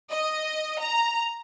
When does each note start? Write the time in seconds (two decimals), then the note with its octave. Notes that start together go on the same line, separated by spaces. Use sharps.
0.11 D#5
0.80 A#5